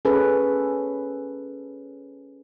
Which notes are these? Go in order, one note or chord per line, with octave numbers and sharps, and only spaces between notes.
C#4 G#4 A4 B4